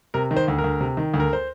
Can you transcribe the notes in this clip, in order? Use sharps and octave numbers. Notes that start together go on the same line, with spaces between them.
C3 A#4
D#3
C5
D2
A#4
D2
C3
D#3
D2
A#4
C5